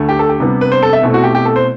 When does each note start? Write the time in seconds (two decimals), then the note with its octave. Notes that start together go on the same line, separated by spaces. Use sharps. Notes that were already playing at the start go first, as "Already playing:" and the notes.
Already playing: D2 D3 A3
0.09 G4
0.19 A4
0.29 G4
0.40 C3 G3 B3 D4
0.61 B4
0.72 C5
0.82 A4
0.93 E5
1.03 B2 A3 C4 E4
1.14 F#4
1.24 G4
1.35 G4
1.45 A4
1.56 C5